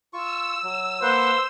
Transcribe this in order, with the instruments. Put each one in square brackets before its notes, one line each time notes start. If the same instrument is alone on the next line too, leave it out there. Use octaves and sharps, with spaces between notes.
[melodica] F4 C#6 [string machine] E6
[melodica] F#3
[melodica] A#3 B4 F#5 [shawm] C5